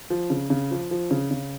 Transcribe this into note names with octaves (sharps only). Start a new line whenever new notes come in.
F3
C#3
C#3
F3
F3
C#3
C#3